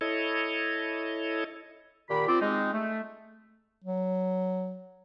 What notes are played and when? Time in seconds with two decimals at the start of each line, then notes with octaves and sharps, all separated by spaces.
0.01 E4 A4 C#5 D#5
2.10 A#2 D#3 G4 B5
2.27 C4 F4 D5
2.41 G#3 C4 D#4
2.73 A3
3.84 F#3